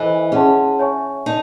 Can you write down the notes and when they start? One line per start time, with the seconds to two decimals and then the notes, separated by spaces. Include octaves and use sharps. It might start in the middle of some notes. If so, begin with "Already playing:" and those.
Already playing: E3 A4 C5 D#5 G#5
0.32 C#4 G#4 C#5 F#5 A5 C6
0.79 C#5 E5 G#5 C#6
1.26 D#4 A5